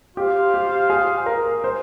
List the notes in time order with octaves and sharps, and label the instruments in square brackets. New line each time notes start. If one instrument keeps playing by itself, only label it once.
[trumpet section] F4 C5 F5 [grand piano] G4
[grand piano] G4
G#4
A#4
C5